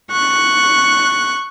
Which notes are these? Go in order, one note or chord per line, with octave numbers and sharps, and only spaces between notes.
C#6 F#6